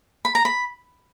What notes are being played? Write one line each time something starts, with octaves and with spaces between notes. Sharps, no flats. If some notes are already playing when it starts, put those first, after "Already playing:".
B5
A#5
B5